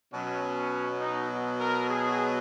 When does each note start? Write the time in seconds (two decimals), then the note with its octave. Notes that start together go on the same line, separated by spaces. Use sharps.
0.13 B2 F#3 C#4
1.00 D#4
1.59 A#4
1.89 G#4